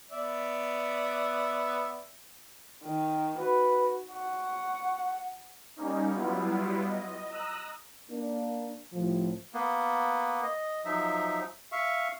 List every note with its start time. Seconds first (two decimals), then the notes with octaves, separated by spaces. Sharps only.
0.11 B3 D5 E5
2.85 D#3
3.39 F#4 B4
4.11 F#5 C#6
5.76 G3 A#3 C#4 D#4
6.15 F#3 G3 B3 E4 F4
6.86 D#5
7.29 A#5 D#6 E6 F#6
8.11 A#3 D4
8.93 C2 A2 F3
9.54 A#3 B3
10.43 D#5
10.85 F3 F#3 D#4 E5
11.72 E5 F5 C#6